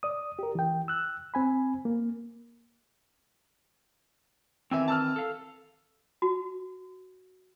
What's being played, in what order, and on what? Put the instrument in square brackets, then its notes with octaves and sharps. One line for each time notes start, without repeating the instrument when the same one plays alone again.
[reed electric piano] D5 D#6
G4 A#4
E3 G5
E6 F#6
C4 G#5 B5
A#3
[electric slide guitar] D#3 E3 C4 [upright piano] E5 G#5 E6
[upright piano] A5 E6 F6
[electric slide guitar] A4 F5
[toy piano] F#4